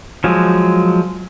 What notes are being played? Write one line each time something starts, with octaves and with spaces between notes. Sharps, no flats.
F3 F#3 G#3